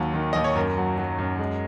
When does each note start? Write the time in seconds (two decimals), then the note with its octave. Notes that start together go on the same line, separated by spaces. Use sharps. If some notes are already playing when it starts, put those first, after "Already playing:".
Already playing: D#2 F#3
0.14 D#3
0.33 D#2 D#5
0.44 C#5
0.55 F#2 A#4
0.77 F#3
0.98 F#3
1.19 F#2
1.39 G#3